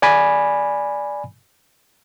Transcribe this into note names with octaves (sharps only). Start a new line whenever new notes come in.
D5 G#5 B5